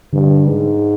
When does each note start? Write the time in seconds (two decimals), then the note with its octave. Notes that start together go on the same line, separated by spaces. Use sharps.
0.13 G2 D3
0.47 G#2